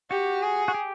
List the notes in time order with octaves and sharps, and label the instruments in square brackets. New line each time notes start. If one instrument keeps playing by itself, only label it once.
[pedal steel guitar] F#4 [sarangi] G4
[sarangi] G#4
[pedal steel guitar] F#4
G4